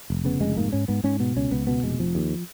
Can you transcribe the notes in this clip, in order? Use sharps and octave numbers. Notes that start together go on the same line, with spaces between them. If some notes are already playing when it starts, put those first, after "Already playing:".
F1
C#3 B3
F1 G#3
G#2 A#3
G#2 C#4
G#2 B3
G#2 C#4
B2 B3
C#2 C#4
C#2 B3
B2 B3
F1 G#3
F1 F3
D#2